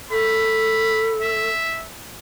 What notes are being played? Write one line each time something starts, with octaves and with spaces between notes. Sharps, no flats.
A4 B5
E5